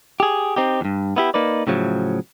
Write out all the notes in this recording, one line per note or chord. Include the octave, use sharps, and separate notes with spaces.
G4 G#4
C4 D#4 G4
E2 G2
B3 E4 G4
A#3 D#4 B4 D5
A2 C#3 F3 F#3